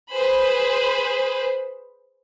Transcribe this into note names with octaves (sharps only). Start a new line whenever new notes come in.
G#4 B4 C5 B5